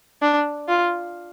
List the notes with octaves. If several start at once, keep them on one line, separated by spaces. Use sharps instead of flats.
D4
F4